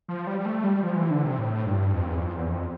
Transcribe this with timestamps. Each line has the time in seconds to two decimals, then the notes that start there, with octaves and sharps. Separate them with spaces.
0.08 F3
0.27 G3
0.40 G3
0.46 A3
0.64 G3
0.83 F3
0.96 E3
1.10 D3
1.24 C3
1.38 A2
1.66 G2
1.93 F2
2.08 E2
2.21 F2
2.35 E2
2.49 F2